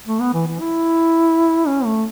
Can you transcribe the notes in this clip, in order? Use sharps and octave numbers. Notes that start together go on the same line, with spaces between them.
A3
B3
E3
E3
E4
C#4
A3